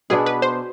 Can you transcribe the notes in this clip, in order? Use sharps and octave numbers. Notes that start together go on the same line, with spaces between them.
B2 B3 D4 G#4
B4
C5